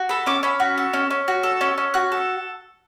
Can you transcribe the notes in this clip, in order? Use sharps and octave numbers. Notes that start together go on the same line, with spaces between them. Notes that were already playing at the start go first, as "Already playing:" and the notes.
Already playing: F#4
A4 B5
C#4 D6
C#4 B5
F#4
A4
C#4
C#4
F#4
A4
C#4
C#4
F#4 F#6
A4